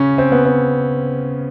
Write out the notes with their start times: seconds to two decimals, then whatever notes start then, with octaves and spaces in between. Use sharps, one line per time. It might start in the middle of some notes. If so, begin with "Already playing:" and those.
Already playing: C#3 C#4
0.18 C4
0.32 B3
0.45 C4